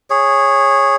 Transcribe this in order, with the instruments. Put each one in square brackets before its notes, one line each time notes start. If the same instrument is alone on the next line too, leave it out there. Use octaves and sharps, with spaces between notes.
[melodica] G#4 C#5